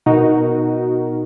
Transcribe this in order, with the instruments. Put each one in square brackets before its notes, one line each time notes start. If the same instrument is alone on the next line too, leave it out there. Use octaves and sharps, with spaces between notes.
[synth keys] B2 D#4 F#4 A#4